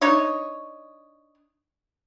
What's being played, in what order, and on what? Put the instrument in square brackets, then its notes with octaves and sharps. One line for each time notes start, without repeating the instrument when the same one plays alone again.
[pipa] D4 D#4 C#5 D#5